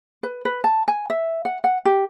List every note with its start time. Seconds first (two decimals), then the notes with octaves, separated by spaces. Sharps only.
0.23 B4
0.45 B4
0.64 A5
0.88 G#5
1.10 E5
1.45 F#5
1.64 F#5
1.85 G4